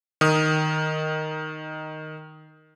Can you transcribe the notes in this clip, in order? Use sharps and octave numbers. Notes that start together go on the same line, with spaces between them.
D#3 D#6